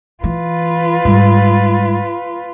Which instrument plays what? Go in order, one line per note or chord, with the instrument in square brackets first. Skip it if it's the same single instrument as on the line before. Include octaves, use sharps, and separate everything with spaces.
[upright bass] E3 [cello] F4 B4
[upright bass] G#2 G3